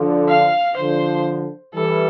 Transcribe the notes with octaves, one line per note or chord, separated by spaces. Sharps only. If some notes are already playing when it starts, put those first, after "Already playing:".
Already playing: D3 F3
F5
D3 F3 C5
E3 G3 A4